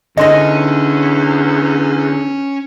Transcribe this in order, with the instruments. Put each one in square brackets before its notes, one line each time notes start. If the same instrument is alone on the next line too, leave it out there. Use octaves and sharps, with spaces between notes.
[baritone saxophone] E2 [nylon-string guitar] D3 D#4 [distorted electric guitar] C#4 G#5 [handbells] D#5 C6 A#6